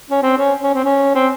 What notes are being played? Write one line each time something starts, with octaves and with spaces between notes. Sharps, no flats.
C#4
C4
C#4
C#4
C4
C#4
C4